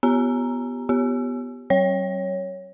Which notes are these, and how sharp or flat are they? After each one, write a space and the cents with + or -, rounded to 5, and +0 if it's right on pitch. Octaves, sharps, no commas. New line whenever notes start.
B3 +0 G4 +0 A#5 +0
B3 +0 G4 +0
F#3 +35 C#5 +0